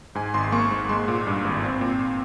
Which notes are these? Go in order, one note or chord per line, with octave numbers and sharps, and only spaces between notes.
G#2 G#5
G#1 C6
A#3 C#6
G#2
G#3 C6
A#2
G2
G#1
C4
A#2